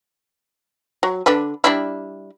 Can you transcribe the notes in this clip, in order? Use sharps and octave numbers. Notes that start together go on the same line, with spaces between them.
F#3
D3 D4 B4
G3 D4 E4